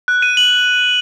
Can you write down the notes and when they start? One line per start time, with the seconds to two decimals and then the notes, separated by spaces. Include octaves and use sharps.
0.08 F#6
0.22 D#7
0.37 F#7